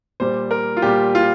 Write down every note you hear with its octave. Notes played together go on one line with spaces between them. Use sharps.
A#2 G3 C5
A#4
F4
A#2 G3 G4
F4